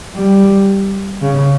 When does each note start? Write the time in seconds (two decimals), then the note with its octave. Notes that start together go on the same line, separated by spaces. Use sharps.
0.16 G3
1.22 C#3